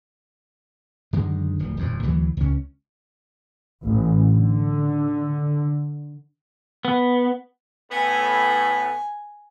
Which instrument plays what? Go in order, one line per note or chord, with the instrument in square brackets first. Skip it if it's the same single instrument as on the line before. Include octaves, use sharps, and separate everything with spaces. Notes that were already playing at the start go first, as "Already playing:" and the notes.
[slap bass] F#2 D3 D#3 G#3
D1 F3
D#1 F2 A2
D2 E3 F#3
C#2 C#4
[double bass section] A1
D3
[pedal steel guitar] B3
[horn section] A2 B3 [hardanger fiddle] G#5